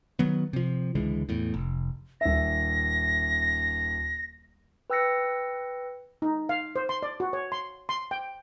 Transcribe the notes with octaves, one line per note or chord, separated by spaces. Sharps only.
D#3 F#3 B3
C3 F3
C#2 D3 E3 G#3
E2 A2
F1
D#1 E5 A#6
B4 G5 E6 F#6 A#6 C#7
D#4
F5
C5
C6
D5
F#4
C#5
C6
C6
G5